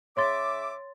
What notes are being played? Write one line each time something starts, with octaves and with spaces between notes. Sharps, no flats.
C#3 C#5 E5 C6 D6 A6